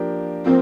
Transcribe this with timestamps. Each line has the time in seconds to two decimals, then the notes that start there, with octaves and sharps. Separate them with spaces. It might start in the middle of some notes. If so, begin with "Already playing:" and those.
Already playing: F3 A#3 D4 G4 A#4
0.45 F3 A#3 C4